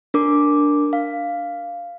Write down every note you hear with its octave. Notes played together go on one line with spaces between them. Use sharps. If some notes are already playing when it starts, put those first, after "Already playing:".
D4 A#4 D6
F5